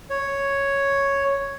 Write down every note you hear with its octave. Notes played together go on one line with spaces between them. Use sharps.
C#5